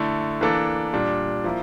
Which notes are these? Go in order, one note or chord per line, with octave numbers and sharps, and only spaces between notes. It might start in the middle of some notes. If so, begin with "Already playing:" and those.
Already playing: D3 A3 E4
E3 A#3 D4 A4 D5
A#2 G3 D4
F3 A#3 E4